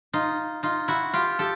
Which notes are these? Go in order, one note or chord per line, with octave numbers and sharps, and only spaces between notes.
D#4 F4
D#4 F4
E4 F#4
F4 G4
G4 A4